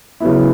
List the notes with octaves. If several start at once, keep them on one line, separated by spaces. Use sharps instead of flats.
C#3 F#3 B3 E4